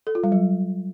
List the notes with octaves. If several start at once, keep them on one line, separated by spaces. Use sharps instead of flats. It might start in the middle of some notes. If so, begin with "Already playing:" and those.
A4
F4
G3
F#3